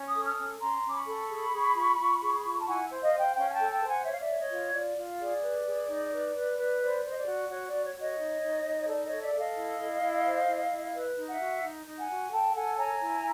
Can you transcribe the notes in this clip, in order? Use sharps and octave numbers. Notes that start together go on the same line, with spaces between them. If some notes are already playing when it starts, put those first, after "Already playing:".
Already playing: C#4
C#6 D#6
A4
D#6 F6
C#4
C#4 A#5 C6
C#4 D6
B5 C#6
A4
G#4
G#4
F4
F4
G#4
F4
A5
E4 F#5 G#5
C5
D#5 F5
C5
F5 G5
C#4 F5 G5
G#5
G5 A5
A4
G5 A5
C5
F#5 G#5
C#5 E5
F5
D5 E5
C#5
C#5 D#5
F4
F4 D5
F4
G#4 D5
B4
G#4
D#4
B4
B4
B4
C5 D5
C5 D#5
D5
F#4
F#4 C#5
D5
F#4
C#5
F#4
C#5 D#5
D#4
D#4
D#4
C#5
A4 D5
C#5 D#5
A4
D5 E5
A4 E5
D#5 F5
E4
E4
E4
C5
E4
E4
B4
D#4
E5 F#5
F#4
D#4
D#4
F#5 G#5
F#4
A4 G5 A5
A4 F#5 G#5
C#5 G#5 A#5
E4